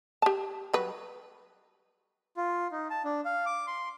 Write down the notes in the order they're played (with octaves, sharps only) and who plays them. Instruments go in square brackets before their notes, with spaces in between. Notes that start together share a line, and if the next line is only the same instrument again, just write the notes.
[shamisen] G4 A5
F#3 G3 B4
[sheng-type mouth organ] F4
D#4
A5
D4
F5
D6
C6